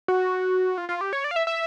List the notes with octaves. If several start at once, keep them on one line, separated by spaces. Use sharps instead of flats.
F#4
F4
F4
G4
C#5
D5
F5
E5
E5